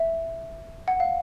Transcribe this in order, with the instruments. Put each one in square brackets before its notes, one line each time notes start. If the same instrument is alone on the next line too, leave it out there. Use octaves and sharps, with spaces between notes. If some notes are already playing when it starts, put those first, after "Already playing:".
Already playing: [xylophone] E5
F#5
F5